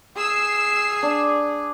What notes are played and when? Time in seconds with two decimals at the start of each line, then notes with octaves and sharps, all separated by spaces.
0.16 G#4 E6 C7
1.03 D4